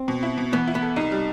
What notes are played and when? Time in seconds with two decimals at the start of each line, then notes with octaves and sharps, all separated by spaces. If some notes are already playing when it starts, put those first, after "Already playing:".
Already playing: C4
0.08 B2
0.23 E4
0.38 B2
0.52 E3 B3
0.68 E4
0.75 B3
0.82 A4
0.96 C2 D#4
1.12 G3